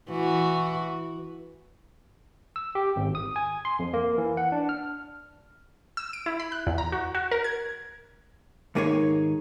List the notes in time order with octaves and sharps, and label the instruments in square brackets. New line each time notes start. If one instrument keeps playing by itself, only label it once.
[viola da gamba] E3 F#4
[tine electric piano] E6
G4
G#1
D#6
G#5
C6
F2
A#3
E3
F#5
D4
F6
[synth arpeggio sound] E6
D7
E4
B5
F#6
E2
A#5
F#4
F#4
A#4
G#6
[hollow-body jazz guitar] D#2 G#2 A#3 D#4 G#4 C#5